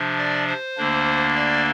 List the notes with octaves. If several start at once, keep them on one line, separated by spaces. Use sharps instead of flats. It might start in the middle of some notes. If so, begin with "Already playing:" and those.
Already playing: C3 F3 D4
D5
C5
D2 D3 A#3 D4
D5